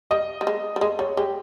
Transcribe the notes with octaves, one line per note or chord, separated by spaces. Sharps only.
G3 D#5
G3
G#3
G3
G#3 D#5
G3 C#5
G#3 G4